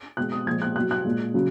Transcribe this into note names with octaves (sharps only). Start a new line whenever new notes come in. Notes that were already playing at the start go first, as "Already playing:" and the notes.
B2 G#3 F#6
D#6
A#2 F3 G#3 G#6
F#6
B2 F#3 F#6
F#6
A#2 G#3
C#3 F#3